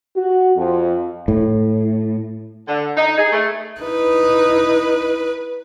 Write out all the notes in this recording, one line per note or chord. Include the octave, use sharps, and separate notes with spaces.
F#4
F2
A2
D3
D#4
G#4
A3
D#4 E4 B4